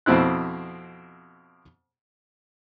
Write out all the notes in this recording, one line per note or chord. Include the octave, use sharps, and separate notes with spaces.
F2 B2 C4 E4 F#6